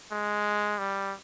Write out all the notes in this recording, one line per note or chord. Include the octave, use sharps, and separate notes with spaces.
G#3
G3